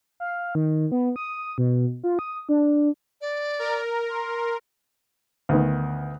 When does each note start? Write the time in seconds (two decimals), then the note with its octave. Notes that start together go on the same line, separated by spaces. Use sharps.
0.20 F5
0.55 D#3
0.92 B3
1.16 D#6
1.58 B2
2.04 F4
2.19 D#6
2.49 D4
3.21 D5
3.59 A#4
4.10 C6
5.49 D2 D#3 B3